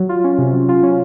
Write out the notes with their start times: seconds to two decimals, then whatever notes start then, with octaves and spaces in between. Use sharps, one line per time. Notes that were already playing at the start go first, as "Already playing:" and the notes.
Already playing: F#3
0.09 F4
0.24 C#4
0.38 C3
0.53 F#3
0.69 F4
0.83 C#4